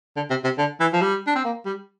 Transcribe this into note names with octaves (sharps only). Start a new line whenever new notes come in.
D3
C3
C3
D3
E3
F3
G3
D4
C4
A#3
G3